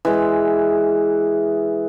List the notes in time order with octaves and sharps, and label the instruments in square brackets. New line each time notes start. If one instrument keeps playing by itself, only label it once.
[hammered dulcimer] E3 G#3